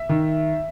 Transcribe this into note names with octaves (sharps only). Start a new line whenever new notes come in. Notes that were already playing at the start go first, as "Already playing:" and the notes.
Already playing: E5
D#3